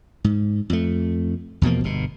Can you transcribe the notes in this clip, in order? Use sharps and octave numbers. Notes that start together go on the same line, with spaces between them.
G#2
F2 A3
E2 B2 F3 A#3
G1 B2